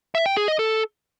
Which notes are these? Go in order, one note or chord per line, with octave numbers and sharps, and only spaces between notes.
E5
G5
G#4
D#5
A4